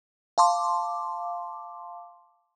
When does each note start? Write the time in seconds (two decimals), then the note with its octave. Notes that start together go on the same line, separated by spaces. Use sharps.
0.38 F5 A5 C6 D6